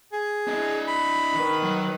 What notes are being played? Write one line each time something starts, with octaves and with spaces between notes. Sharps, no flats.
G#4
D4 D#5
B5
D#3 B4
F#3